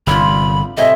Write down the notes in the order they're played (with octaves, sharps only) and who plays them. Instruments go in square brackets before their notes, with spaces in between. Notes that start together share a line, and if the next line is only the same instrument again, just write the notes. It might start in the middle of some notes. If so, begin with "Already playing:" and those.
[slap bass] G1 C3 [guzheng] D4 E4 F4 [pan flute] B5
[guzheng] A2 C3 G#4 [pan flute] D#5 [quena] E5